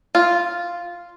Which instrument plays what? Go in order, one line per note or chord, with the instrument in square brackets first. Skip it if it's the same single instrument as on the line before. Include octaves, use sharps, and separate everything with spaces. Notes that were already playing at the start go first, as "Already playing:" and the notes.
[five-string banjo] F4